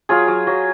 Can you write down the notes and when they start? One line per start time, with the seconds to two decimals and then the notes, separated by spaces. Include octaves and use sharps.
0.09 F#3 F4 G#4
0.28 F#3
0.47 F#3